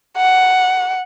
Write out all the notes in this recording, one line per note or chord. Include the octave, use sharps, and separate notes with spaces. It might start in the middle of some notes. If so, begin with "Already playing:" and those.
F#5